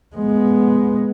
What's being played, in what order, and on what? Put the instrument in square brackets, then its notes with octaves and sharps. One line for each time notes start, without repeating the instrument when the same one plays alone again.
[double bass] G#3 B3